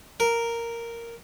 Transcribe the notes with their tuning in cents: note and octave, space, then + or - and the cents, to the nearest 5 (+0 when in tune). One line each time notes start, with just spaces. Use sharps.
A#4 -5